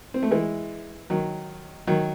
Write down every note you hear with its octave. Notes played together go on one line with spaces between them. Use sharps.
C4
A3
E3 G#3
D#3 F#3
D#3 F#3